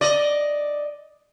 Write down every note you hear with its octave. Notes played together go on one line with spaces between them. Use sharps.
D5 D#5